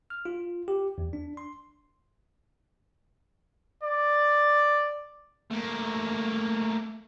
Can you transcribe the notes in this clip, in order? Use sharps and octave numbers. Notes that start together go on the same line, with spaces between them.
F6
F4
G4
E2
D4
C6
D5
A3 A#3